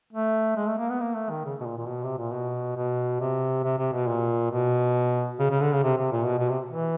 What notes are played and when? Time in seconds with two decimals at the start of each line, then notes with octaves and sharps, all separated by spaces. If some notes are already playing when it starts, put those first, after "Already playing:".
0.13 A3
0.57 G#3
0.68 A3
0.78 A#3
0.90 B3
1.01 A#3
1.16 A3
1.30 D#3
1.45 C#3
1.60 B2
1.66 A#2
1.78 A#2
1.88 B2
2.04 C3
2.18 A#2
2.33 B2
2.76 B2
3.20 C3
3.64 C3
3.78 C3
3.93 B2
4.08 A#2
4.51 B2
5.39 C#3
5.50 C#3
5.61 D3
5.72 C#3
5.83 C3
5.97 C3
6.12 A#2
6.26 B2
6.39 B2
6.49 C3
6.71 E3